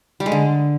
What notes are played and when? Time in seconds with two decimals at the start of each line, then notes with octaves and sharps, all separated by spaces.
0.20 G3
0.26 G#3
0.32 D3